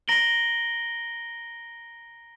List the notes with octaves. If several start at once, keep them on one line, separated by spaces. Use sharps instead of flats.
A#5 A#6 D7 F#7 G7